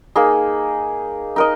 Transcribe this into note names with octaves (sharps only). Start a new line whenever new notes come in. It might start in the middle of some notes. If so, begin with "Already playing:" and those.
A#3 D#4 G#4
D#4 A#4 D#5